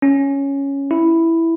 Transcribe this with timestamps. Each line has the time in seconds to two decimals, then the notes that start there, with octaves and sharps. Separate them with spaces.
0.02 C#4
0.91 E4